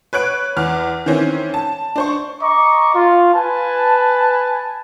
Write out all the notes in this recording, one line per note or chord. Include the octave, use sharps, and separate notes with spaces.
B4 C#5 F#6 D7
E2 F6
D#3 E3 C4 C#4
A5
D4 C5 C#6
D#5 A#5 C#6 D6
F4
B4 G#5 A5